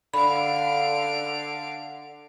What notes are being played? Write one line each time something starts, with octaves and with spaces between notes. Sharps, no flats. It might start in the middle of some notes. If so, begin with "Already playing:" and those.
D3 F5 B5 D7